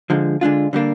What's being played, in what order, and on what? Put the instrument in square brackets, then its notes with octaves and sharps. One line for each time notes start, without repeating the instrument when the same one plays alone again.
[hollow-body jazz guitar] D3 F3 G#3
D3 G#3 D4 F4
D3 G3 A#3 D4